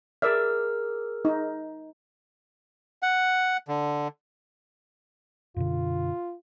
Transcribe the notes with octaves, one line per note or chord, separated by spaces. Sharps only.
G#4 A#4 D5 E5 F6
D#4
F#5
D3
F#2 B2 D3 F4